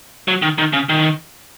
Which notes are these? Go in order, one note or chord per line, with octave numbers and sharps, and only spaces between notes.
F#3
D#3
D#3
C#3
D#3